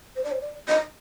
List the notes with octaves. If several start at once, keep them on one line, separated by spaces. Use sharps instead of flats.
C5
D5
C5
D5
D#5